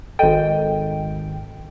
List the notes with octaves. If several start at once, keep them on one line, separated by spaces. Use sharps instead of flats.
G#1 A4 D#5 G5